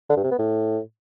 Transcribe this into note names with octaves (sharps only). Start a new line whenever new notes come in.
D3
G2
C3
B3
A2